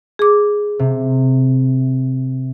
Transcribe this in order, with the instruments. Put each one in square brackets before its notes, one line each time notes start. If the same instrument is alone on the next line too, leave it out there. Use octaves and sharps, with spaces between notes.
[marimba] G#4 D6
[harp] C3